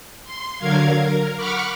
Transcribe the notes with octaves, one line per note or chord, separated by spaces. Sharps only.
C6
D3 F#3 A#4 F5 G#6
A#4
F#5 B5 C#6 D6 F6